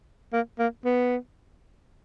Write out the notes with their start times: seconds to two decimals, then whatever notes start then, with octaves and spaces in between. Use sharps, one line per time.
0.33 A#3
0.59 A#3
0.85 B3